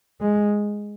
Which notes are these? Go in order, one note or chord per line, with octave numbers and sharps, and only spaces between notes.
G#3